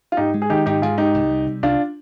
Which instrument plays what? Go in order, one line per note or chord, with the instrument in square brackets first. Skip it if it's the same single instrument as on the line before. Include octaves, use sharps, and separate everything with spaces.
[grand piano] F4
[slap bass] G#2 [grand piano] D#4 G4
[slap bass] G#3
[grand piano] G#4
[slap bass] D#3 [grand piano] D#4 G4
[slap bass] G#2 [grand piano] D#4 G4
[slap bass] G#2 [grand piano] F4 G#4
[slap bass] G#3 [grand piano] D#4 G4
[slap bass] C2
G3
C3
[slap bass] C2 [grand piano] D4 F4